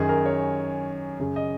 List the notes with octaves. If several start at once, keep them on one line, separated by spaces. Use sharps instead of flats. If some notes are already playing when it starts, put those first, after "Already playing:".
Already playing: F#2 D#3 G#4
A#4
C#5
F#2 C#3
D#5